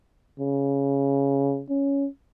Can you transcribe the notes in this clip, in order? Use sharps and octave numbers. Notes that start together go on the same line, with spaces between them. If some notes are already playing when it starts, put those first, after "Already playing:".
C#3
C#4